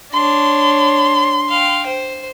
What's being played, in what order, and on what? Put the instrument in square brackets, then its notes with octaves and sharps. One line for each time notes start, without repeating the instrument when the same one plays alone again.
[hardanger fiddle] D4 C#5 [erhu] C6
[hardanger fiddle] F5 G5
C5